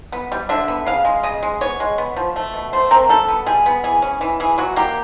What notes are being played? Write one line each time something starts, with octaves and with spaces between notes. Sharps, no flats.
B3
G3
D3 E5
B3
C#3 F5
G#3
C#3 D#5
G#3
B3 C#5
G#3
B3
F3
A3
B2
A3 C5
C4 A#4
G3 A4
B3
G3 G#4
B3
E3 G#4
C#4
E3
E3 G#4
F#3 F#4
A#3 G4